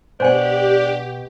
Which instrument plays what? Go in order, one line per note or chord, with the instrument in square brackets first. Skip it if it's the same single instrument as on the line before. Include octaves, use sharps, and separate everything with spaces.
[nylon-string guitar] B2 F#5 [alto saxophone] D4 [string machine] G4 [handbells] C5 G#5